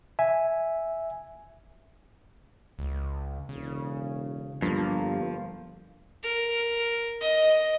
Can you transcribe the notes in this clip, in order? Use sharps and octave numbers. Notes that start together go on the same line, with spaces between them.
E5 G#5
C#2
E1 C#3
G1 G2 F3 A#3
A#4
D#5